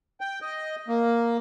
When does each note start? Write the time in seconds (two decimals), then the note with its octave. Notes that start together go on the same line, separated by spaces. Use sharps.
0.21 G5
0.42 D#5
0.88 A#3